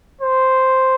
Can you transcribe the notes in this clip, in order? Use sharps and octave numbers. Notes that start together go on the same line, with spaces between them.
C5